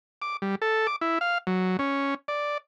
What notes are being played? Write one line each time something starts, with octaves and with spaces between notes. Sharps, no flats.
D6
G3
A4
D6
E4
F5
F#3
C#4
D5